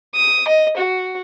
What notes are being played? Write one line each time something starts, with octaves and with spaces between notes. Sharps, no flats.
D#6
D#5
F#4